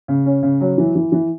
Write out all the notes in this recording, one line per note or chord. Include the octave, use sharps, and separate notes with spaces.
C#3
C#4
C#3
F#3
E3
E3
E3